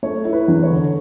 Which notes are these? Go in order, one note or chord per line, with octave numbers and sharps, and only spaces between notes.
A3 C#5
E4
B4
E2
C#5
D3